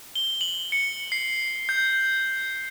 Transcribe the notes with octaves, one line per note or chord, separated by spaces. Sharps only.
G7
F#7
C#7
C7
G6